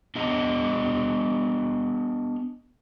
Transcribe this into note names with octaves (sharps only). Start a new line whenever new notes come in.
B3 D4 G#4 D#5 A#5